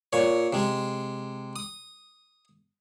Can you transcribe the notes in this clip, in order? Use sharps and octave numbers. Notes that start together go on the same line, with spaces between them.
A#2 C#5
C3 G#3
D#6